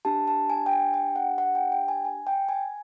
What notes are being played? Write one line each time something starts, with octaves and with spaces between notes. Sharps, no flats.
D4 G4 A5
A5
G#5
G5
G#5
G5
F#5
F#5
G5
G5
G#5
G#5
G5
G#5